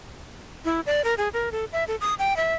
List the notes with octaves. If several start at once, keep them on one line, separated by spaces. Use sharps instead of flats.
E4
D5
A#4
G#4
A#4
A4
E5
A4
D#6
G5
E5